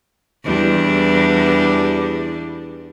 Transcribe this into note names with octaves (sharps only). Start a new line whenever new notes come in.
E2 G3 D4